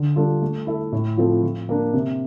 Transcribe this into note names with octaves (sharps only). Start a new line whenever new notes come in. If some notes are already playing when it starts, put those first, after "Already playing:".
Already playing: D3
G3 D4 F4 A4
A3
E4 A4 E5
A2
F3 C4 F4 A4
F3
A#3 D4
C3